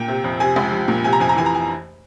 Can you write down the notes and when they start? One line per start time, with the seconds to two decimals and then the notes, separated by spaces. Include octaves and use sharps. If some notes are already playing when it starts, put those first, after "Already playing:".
Already playing: A#2 G5
0.08 C3
0.24 F2
0.40 C3 G#5
0.56 C#2
0.72 F3
0.88 A#2
1.04 C3 G#5
1.13 A#5
1.20 F2 G#5
1.29 A#5
1.36 E3 G#5
1.46 A#5
1.55 G#5